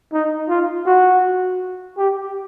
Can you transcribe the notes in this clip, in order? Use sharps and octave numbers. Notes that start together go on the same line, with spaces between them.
D#4
F4
F#4
G4